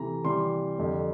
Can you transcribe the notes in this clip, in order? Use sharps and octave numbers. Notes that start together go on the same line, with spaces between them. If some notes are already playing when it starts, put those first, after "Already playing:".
Already playing: C3 E3 A3 A#5
C3 E3 G3 C6
F2 D3 G3